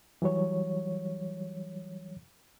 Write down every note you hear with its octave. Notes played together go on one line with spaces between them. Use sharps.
E3 F#3 G3 C#5